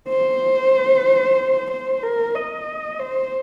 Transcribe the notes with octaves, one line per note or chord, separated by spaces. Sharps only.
C5
C5
A#4
D#5
C5